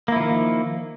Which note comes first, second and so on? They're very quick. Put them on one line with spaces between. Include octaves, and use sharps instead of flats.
A#3 E4 F3 D#3